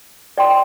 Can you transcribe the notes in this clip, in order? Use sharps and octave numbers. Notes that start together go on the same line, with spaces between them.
D5 G5 C6